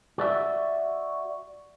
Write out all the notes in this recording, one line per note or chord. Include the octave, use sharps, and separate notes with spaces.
F#4 D5 E5